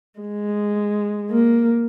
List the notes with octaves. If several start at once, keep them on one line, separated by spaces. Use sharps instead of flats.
G#3
A#3